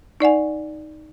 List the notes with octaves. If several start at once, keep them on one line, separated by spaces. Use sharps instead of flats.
D#4 D5 F#5 G#5